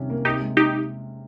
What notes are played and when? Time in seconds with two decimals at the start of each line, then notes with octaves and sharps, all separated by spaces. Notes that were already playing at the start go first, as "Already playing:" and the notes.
Already playing: C3 D#3 G3 C#4
0.10 A#3
0.25 C3 D#4 G4
0.41 G#3
0.57 D#4 G4